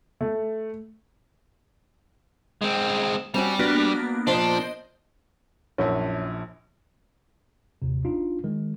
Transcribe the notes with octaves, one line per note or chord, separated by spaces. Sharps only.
A3
G#3 C4
G3 C4 C#4 F#4 F7
A#3 B3 D4 F#4
A#2 F3 D4 C5 D#5 G7
A#1 F#2 C#4 E4
G1 D#2 C3
G#1 D4 D#4 F4
D#3 G#3